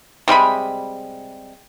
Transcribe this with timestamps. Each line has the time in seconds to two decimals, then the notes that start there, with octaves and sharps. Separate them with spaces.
0.28 C3 G3 G#3 B5